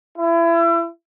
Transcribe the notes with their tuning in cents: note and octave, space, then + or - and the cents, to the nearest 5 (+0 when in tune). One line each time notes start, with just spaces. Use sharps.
E4 +30